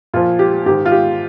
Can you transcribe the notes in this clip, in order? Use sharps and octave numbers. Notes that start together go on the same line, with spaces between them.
A#2 F3 F4
G4
G#2 D#3 G4
F4
G4